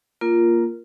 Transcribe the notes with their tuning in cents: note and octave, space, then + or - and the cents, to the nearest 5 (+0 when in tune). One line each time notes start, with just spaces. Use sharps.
A#3 +0 F4 -10 A#4 +5